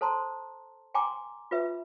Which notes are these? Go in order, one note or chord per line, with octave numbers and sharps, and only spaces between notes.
A4 C5 A5 A#5 C6
G5 G#5 A#5 C6 D6
F4 B4 E5